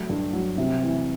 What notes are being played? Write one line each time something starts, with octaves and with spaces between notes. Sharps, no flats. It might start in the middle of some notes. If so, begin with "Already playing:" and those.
Already playing: F#3 A3
G2
F#3
C3
E3